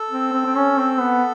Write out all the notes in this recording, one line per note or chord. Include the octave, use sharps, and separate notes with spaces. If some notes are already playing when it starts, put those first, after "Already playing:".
Already playing: A4
C4
C4
C4
C#4
C4
B3